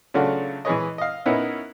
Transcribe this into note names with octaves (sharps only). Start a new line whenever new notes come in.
C#3 F#3 A3 D4 F4 F#4
E3 G#3 G#4 B4 C#5 D#5
D#5 F5
B3 C#4 D#4 E4 A#4 B4